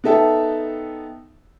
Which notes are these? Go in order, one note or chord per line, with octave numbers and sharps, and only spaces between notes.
B3 D#4 A4 E5 G5 A5